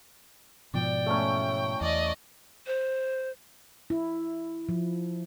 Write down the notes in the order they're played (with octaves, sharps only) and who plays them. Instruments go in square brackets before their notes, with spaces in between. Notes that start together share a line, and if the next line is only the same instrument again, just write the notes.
[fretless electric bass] G#2 B2 F3 [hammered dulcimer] D5 [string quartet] G5
[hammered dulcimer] C#3 F#3 E4 [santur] A3 C#4
[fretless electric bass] E2 [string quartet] D5 D#5 D6
[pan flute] C5
[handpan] E4
F3